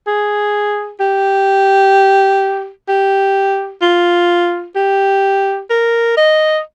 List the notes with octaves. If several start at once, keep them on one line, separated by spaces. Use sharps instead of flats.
G#4
G4
G4
F4
G4
A#4
D#5